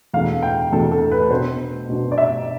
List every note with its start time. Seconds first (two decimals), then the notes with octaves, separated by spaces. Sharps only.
0.13 E2 B2 A3 D4 F5
0.43 G5
0.72 E2 B2 A3 D4 A4
0.91 A4
1.12 B4
1.30 B2 B3 D4 C5
1.89 B2 B3 D4
2.12 D5
2.18 E5